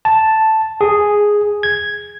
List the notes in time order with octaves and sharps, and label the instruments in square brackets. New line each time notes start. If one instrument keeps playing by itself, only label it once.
[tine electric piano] A5
G#4
G#6